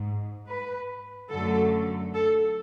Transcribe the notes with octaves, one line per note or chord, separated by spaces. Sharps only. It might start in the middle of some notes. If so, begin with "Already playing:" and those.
Already playing: G#2
B4
F#2 D3 F#3 A3 A4
A4